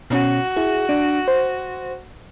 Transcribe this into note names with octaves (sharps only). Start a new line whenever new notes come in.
B2 C#4 F#4
E4 G#4
D4
C5